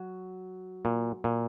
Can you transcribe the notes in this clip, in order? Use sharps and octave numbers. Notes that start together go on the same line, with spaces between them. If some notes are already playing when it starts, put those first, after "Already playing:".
Already playing: F#3 F#4
A#2
A#2